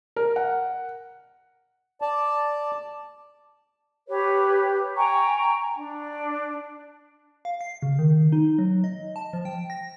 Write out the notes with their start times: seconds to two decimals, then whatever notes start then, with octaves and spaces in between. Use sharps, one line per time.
0.16 A#4
0.36 F#5
2.02 D5 A5
4.08 G4 B4 C#5
4.96 G5 G#5 A#5 C#6
5.75 D4
7.45 F5
7.61 C7
7.83 C#3
7.99 D#3
8.32 D#4
8.59 F#3
8.84 D#5
9.16 A5
9.33 F3
9.45 G5
9.70 A#6